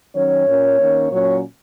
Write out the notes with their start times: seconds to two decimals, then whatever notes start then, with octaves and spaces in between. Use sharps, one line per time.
0.15 D#3 F#3 C#4 C#5
0.47 A#2 A#3 C#4
0.79 D#3 A#3 C#4
1.10 A#2 F#3 C#4 C#5